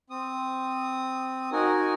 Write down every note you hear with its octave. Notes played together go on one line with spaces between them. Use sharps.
C4 D#6
D#4 F#4 A#4 G#5